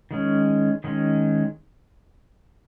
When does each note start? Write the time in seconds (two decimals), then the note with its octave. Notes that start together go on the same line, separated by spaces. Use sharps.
0.11 D#3 G#3 C#4
0.84 D#3 G#3 C#4